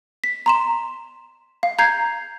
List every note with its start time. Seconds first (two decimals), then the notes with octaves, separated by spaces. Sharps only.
0.24 B6
0.46 A#5 C6 E7
1.63 F5
1.79 A#5 G6 G#6 C7